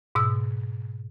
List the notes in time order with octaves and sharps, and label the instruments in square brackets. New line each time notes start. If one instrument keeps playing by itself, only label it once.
[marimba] G#2 B2 E6